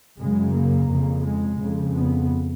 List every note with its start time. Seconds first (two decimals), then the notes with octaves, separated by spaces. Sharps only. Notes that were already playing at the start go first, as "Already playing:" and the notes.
0.19 F#2 C#3 G#3
0.54 A#3
0.90 F2 C#3
1.25 G#3
1.60 F2 C#3
1.95 B3